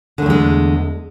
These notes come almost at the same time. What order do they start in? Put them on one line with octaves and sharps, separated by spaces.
D3 A3 E2 G#3